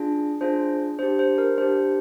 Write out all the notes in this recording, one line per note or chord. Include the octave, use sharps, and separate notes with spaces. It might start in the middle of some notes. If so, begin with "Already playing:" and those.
Already playing: D4 F4 G#4
D4 F4 G#4 C5
D4 G4 C5
C5
A#4
D4 G4 C5